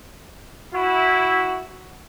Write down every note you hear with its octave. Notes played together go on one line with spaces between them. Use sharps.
E4 F#4